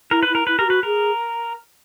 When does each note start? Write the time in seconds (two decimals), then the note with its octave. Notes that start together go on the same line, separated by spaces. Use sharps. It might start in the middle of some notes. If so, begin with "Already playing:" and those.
0.11 E4 A#4
0.23 B4
0.30 E4 A#4
0.47 E4 B4
0.59 G4 A#4
0.67 F#4 B4
0.83 G#4 A#4